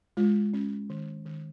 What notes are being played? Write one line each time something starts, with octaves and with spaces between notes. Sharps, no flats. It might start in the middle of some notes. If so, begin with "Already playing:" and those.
G#3 F4
C#4
D#3
D#3